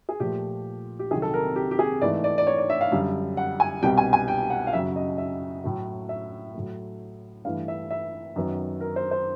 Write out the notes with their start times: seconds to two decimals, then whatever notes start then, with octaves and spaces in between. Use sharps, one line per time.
0.09 G#4
0.20 A#2 F3 A3 G4
0.99 G4
1.11 C2 C3 D#3 F#3 G#4
1.22 A4
1.34 A#4
1.56 G4
1.71 G4
1.79 G#4
2.01 G#2 E3 A3 D5
2.24 D5
2.38 D5
2.47 C#5
2.58 D5
2.70 E5
2.81 F5
2.92 F#2 D3 G3
3.37 F#5
3.60 G#5
3.83 C2 B2 G3 G5
3.98 G#5
4.13 G#5
4.28 G5
4.50 F#5
4.67 F5
4.73 F#2 C#3 F#3 E5
4.96 D#5
5.18 E5
5.64 A2 F#3 A3
6.09 E5
6.54 A2 F#3 A3
7.45 G2 E3 A3 F5
7.68 E5
7.90 E5
8.36 F#2 D#3 F#3 B3
8.81 A#4
8.96 C5
9.11 C5